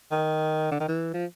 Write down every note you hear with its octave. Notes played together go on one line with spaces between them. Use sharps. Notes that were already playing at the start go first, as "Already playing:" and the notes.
D#3
D3
D#3
E3
F3